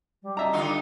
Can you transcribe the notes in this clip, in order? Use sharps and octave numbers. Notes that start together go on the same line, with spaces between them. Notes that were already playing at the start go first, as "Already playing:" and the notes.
G3
D#5 E5 A#5
D3 D#4 F4